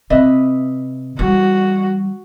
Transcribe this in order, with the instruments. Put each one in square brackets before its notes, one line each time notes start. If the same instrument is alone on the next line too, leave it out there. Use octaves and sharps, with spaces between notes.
[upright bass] C3 [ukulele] B4 D#5 E5
[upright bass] E3 G3 [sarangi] F#4